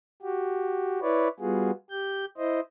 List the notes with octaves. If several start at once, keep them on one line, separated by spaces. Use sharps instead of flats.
F#4 G4
E4 B4 C#5 D5
G3 B3 F4 F#4 G#4
G4 G6
E4 C5 D#5